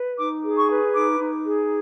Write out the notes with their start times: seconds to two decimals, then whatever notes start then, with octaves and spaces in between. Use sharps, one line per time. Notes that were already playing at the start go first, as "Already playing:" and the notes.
Already playing: B4
0.19 D#4 D6
0.44 G#4
0.57 C#6
0.70 B4
0.95 D#4 D6
1.20 D#4
1.45 G#4